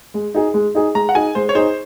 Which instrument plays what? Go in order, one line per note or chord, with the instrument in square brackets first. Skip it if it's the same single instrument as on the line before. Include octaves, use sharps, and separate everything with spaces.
[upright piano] G#3
D#4 G#4
G#3
D#4 G#4
[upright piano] G#3 [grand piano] A#5
[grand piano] F#5
[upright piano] D#4 G#4 [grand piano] G#5
[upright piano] G#3 [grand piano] C5
[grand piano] C#5
[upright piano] D#4 G#4 [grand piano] C5